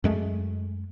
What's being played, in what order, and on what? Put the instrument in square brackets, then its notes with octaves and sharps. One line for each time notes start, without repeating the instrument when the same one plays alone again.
[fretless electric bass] F#2 G#3 A3